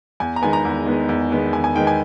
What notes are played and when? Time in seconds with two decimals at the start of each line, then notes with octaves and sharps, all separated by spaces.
0.20 E2 G#5
0.36 A#5
0.42 D#3 G#3 B3 G#5
0.53 A#5
0.65 E2
0.86 D#3 G#3 B3
1.09 E2
1.31 D#3 G#3 B3
1.53 E2 G#5
1.64 G#5
1.76 D#3 G#3 B3 G5
1.87 G#5